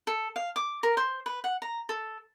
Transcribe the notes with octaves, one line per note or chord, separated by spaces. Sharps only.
A4
F5
D6
A#4
C5
B4
F#5
A#5
A4